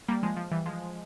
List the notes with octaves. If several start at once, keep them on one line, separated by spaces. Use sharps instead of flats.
G3 A#3
F3 G#3
F3
E3 G3
F3 G#3